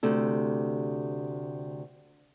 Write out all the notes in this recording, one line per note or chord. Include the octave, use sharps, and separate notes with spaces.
D2 C3 A4